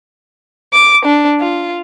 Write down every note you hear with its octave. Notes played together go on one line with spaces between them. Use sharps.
D6
D4
F4